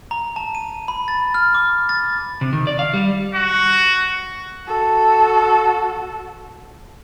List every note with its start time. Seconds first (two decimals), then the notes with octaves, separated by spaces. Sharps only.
0.11 A#5
0.36 A5
0.55 D#7
0.88 B5
1.08 A6
1.34 F6
1.55 D6
1.89 A6
2.41 C3
2.53 D#3
2.67 D5
2.79 F5
2.94 G3
3.34 F#4
4.67 F#4 A4